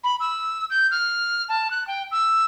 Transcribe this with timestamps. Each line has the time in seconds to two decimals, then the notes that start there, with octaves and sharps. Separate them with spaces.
0.04 B5
0.20 E6
0.70 G6
0.91 F6
1.49 A5
1.71 F#6
1.88 G5
2.12 E6